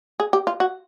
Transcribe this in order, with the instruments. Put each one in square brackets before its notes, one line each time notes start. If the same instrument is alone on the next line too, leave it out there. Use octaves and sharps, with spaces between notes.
[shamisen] G#4
G4
F4
F#4